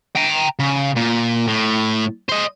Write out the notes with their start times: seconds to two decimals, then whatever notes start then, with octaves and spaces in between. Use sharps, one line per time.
0.16 G5 A#5
0.59 C#3
0.97 A#2
1.47 A2
2.29 C5 D#5